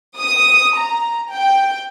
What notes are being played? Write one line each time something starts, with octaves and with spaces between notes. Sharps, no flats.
D#6
A#5
G5